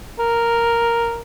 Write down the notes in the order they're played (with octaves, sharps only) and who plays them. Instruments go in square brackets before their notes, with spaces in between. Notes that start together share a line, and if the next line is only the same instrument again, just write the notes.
[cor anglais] A#4